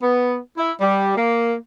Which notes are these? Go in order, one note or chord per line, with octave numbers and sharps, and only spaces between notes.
B3
E4
G3
A#3